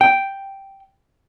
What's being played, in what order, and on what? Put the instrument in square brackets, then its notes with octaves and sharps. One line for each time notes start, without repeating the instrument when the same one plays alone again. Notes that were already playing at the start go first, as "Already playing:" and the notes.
[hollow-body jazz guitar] G5